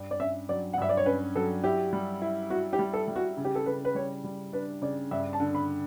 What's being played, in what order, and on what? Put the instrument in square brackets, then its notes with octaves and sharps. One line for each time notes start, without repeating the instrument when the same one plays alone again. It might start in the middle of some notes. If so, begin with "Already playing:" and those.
Already playing: [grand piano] G2
[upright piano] D5
[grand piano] C#4 [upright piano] E5
[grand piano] F#3 [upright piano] D5
[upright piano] F#5
[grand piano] G2 [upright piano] E5
[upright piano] D5
C#5
[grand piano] C#4 [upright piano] B4
[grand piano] F#3 [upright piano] A4
[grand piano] E4 [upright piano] G4
[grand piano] G3
E4
[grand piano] E4 [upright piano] F#4
[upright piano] G4
[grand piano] G3
[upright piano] A4
[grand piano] G3
[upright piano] F#4
[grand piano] C#3
[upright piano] G4
A4
[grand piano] C#3 [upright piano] B4
[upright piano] B4
[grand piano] G3 [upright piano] C#5
[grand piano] G3
[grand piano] D4 [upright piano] B4
[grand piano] C#3 [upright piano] D5
[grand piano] G2 [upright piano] E5
[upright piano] A5
[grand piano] D3
[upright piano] B5